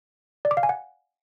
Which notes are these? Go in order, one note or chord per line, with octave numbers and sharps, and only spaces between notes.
D5
D6
F5
G#5
F#5